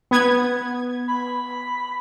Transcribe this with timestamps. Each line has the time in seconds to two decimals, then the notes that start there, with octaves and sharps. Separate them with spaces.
0.11 B3 G#6
1.08 B5